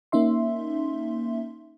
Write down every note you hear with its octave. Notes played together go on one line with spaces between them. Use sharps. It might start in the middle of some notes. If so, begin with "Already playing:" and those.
A#3 C#4 D#4 E5 C6